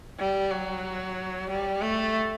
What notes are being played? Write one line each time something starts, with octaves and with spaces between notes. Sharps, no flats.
G3
F#3
G3
A3